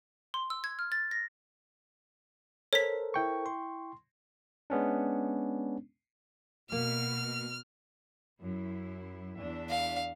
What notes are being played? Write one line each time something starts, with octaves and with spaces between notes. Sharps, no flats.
C6
E6
G#6
F6
A6
A#6
A4 A#4 C5 C#5 B6
E4 G5 C#6
C6
G#3 B3 C#4 D4
B2 A#3 F6
F#2 E4
E2 D4 E5
F5